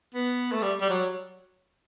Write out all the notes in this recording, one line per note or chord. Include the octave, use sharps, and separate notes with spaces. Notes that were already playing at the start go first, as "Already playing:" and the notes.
B3
A3
G3
G3
F#3